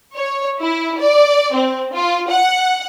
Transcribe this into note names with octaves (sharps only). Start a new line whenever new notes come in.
C#5
E4
D5
C4
F4
F#5